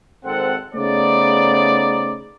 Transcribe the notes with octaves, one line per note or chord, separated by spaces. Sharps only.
G#1 C4 A4 F#5
C#3 A3 B3 D#4 C5 D5